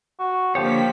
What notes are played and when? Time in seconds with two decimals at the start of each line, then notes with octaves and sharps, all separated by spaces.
0.19 F#4
0.55 D3 F3 A#3 G4 C#5 B6